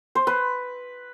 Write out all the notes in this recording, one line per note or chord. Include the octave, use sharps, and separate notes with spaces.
C5
B4